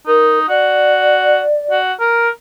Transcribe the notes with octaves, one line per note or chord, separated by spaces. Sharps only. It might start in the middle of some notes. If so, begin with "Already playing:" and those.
D#4 A#4
F#4 D5
F#4
A#4